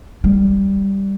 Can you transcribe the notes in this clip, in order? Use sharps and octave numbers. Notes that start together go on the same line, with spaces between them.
G3